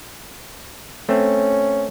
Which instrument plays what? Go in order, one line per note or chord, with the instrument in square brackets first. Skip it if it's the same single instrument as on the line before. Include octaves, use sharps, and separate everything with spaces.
[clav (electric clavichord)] A3 C4 [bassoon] C#4